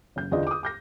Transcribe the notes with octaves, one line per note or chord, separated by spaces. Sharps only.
F#1 G6
E2 D3 D4 F4 D#5
D6 D#6
D6 G6 A#6